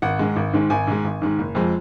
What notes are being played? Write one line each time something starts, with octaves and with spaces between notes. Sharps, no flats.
G#1 F#5
G#2 D#3 G#3
G#1
G#2 D#3 G#3
G#1 G#5
G#2 D#3 G#3
G#1
G#2 D#3 G#3
F#1
F2 F3 G#3